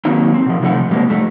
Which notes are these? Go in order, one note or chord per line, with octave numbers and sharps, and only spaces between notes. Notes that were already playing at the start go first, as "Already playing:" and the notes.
D#3 F#3 A#3 C4 D#4
C4
B2 F3
C3 D#3 F3 A3 F#5
B2 G3 G#3 A#3 C4
F2 A3